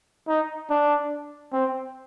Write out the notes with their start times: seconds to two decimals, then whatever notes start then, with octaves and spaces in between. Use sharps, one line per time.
0.28 D#4
0.70 D4
1.53 C4